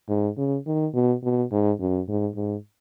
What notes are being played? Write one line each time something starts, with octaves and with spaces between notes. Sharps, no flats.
G#2
C#3
D#3
B2
B2
G#2
F#2
G#2
G#2